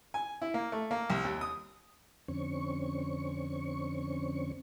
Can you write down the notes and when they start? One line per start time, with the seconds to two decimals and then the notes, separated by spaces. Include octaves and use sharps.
0.14 G#5
0.42 E4
0.54 A#3
0.72 A3
0.91 A#3
1.10 C2
1.25 D#2
1.41 D#6
2.28 F2 D3 C4 C#4 C#6